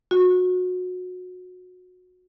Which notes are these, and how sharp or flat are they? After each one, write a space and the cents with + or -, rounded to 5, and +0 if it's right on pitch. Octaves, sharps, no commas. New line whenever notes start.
F#4 -25